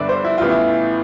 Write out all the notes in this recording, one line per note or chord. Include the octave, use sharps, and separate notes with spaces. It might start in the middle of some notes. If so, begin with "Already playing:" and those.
Already playing: G1 G2 D3 B3 D5 E5
C5
E4
A1 A2 E3 B3 F4
E4